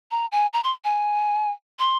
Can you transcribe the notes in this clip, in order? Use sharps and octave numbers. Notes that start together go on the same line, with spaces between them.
A#5
G#5
A#5
C6
G#5
C6